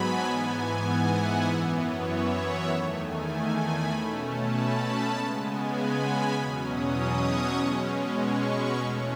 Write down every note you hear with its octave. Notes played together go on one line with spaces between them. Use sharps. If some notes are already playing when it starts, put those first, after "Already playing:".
Already playing: G#2 F#3 B3 G#5 A5 B5
G#2 E3 B3 G#5
F#5
E5
F#2 E3 B3
C#5
E5
F#5
E2 D#3 A3 G#5
G#5
B5
B2 A3 C#4 B5
A5
B5
B5
C#3 G#3 B3 A5
G#5
B5
E2 B2 F#3 C#4
D#6
C#6
B2 G#3 C#4
C#6
B5
E2 B2 A3 C#4